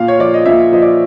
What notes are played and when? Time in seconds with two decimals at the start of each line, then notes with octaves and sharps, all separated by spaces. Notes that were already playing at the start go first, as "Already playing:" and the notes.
Already playing: A#2 F5
0.08 C#5
0.19 F3 D5
0.34 D#5
0.46 A#2 E5
0.72 F3 D#5
0.82 D5